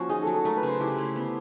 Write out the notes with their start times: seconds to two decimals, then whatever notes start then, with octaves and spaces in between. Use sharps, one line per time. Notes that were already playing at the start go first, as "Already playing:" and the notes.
Already playing: F3 A#3 C#4 F#4
0.09 D#4 G#4
0.22 A4
0.27 F#3
0.32 A4
0.45 A3 A#4
0.56 B4
0.63 C#3
0.68 C5
0.81 E4 G4
0.98 A3
1.16 B3